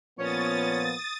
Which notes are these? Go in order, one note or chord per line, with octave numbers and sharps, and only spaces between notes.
A#2 F3 B3 C#4 C#5 D#6 A6